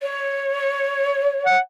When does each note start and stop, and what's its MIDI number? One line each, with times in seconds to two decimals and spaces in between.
0.02 1.55 73
1.46 1.60 78